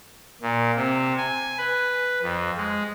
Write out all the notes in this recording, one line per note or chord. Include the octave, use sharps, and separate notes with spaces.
A#2
C3
G#5
B4
F2
G#3